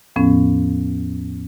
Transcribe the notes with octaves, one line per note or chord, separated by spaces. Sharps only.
E2 A2 F3 B3 C#4